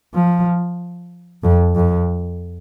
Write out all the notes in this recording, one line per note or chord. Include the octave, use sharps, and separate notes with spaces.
F3
F2
F2